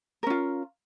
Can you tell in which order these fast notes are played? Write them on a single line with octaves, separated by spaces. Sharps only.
A#4 C#4 F4